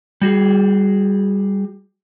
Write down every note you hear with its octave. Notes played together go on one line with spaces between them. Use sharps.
G3 F#4 G#4